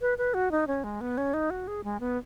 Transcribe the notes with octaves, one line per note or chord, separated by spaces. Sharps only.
B4
B4
F#4
D#4
C#4
G#3
B3
C#4
D#4
F#4
G#4
G#3
B3